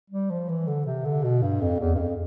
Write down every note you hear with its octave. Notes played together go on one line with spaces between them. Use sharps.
G3
F3
E3
D3
C3
D3
B2
G2
F2
E2
G2
F2